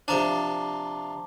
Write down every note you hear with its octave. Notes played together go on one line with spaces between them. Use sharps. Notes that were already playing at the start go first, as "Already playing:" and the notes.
C3 F3 D4 A5 A#5 D6